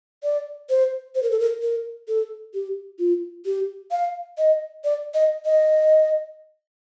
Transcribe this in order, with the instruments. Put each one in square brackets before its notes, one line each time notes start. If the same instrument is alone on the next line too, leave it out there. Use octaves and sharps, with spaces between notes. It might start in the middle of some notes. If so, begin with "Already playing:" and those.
[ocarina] D5
C5
C5
A#4
A4
A#4
A#4
A4
G4
F4
G4
F5
D#5
D5
D#5
D#5